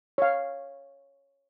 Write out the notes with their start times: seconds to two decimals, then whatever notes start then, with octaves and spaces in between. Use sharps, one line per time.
0.18 C#5 F5